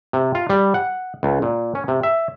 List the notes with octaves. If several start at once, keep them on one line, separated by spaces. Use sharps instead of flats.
C3
F4
G3
F#5
C#2
A#2
C#4
C3
E5